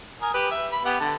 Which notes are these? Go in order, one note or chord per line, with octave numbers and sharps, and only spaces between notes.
A#4 G#5 D#6
G4 B4
E5
B5
B3 G4 F#5
D3 A5